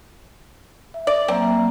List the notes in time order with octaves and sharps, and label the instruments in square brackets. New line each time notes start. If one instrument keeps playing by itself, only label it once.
[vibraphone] E5
[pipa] D5
[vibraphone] F#3 A#3 E5 [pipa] C4